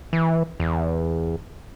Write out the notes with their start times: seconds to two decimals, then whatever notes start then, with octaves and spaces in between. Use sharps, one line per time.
0.13 E3
0.60 E2